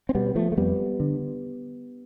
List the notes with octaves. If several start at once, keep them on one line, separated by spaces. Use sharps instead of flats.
C4
B2 G3 B3
F3 A3
A3
F2 G3 B3
D3